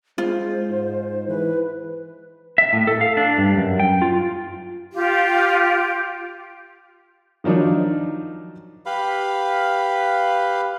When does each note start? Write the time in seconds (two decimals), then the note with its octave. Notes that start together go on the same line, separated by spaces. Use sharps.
0.18 G#3 F4 C5
0.70 G#2
1.28 E3 B4
2.58 E5
2.73 A2
2.87 A4
3.01 F5
3.17 D4
3.38 G2
3.57 F#2
3.80 G5
4.02 F4
4.93 F4 G4
7.44 D#3 F3 F#3 D4 D#4
8.86 G4 B4 F5 B5